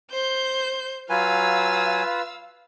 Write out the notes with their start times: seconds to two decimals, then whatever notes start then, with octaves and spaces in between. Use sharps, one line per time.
0.11 C5 G6
1.10 F#3 F4 B4 F5 G#5 E6